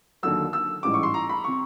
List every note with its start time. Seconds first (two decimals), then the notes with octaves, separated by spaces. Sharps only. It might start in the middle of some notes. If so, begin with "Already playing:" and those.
0.23 D#2 D3 F#3 E6
0.53 E6
0.83 A1 G#2 E3 G3 D6
0.94 C#6
1.03 C6
1.14 A#5
1.29 B5
1.44 C3 C#6